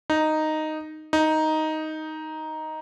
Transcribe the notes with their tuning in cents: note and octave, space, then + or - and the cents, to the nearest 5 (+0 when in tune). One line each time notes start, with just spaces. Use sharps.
D#4 -5
D#4 +5